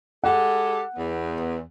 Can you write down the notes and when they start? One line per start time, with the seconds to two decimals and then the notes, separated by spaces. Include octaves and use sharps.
0.24 G#3 G4 A4 F#5
0.96 E2 B3